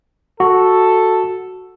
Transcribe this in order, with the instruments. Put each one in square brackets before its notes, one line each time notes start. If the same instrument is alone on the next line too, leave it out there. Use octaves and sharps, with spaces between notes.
[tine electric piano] F#4 [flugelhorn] A4